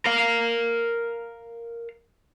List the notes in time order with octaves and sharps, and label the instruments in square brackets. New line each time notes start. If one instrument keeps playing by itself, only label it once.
[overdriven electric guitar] A#4 F5